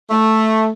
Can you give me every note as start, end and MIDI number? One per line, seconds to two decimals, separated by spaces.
0.11 0.69 57